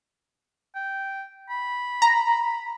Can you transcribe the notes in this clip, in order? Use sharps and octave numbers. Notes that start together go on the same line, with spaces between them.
G5
B5
A#5